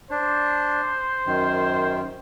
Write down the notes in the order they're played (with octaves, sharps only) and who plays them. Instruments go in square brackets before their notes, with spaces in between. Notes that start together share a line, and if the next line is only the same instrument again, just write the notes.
[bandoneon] D4 [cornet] C5
[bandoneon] F#2 D#3